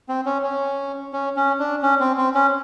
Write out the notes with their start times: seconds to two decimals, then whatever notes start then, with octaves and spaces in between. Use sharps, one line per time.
0.09 C4
0.26 C#4
0.43 C#4
1.13 C#4
1.36 C#4
1.59 D4
1.82 C#4
2.00 C4
2.17 C4
2.35 C#4